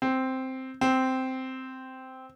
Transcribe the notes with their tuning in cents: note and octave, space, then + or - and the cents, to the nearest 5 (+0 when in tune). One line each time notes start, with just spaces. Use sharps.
C4 +0
C4 -5